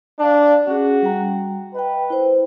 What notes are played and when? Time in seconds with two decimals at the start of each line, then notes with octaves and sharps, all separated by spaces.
0.19 D4 F5 A5
0.68 C#4 F#4 G#4
1.02 G3 G5 A#5
1.75 B4 D#5 G5
2.10 E4 C5